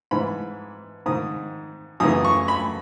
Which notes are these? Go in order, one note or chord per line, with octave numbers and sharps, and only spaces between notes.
G#2 E3 B5
G#2 D#3 D#6
F#2 C#3 E3 D#6
C#6
B5